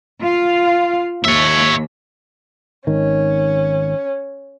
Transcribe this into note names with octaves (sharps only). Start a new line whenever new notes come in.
F4 F5
D#2 C#5 E5
G#1 D#3 C#4